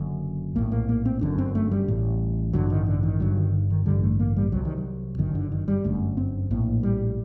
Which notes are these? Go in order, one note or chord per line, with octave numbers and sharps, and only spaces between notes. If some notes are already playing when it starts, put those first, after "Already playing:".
Already playing: F#1 F#2 D3
A#1 A2 A#3
A#3
A#3
C4
G1 F#2 D3 D4
C4
A3
G3
A1 A2
A1 G2 D3 F#3
D#3
D3
D#3
G1 G2 D3 F#3
D#3
D#3
A1 G2 D3 G3
A3
A#3
G3
C2 C3 F#3
D#3
F#3
G1 F#2 D3 D#3
D3
D#3
G3
G1 F#2 D3 A3
C4
A#1 A2 A#3
G3